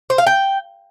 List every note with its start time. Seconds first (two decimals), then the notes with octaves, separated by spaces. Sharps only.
0.10 C5
0.18 F5
0.27 G5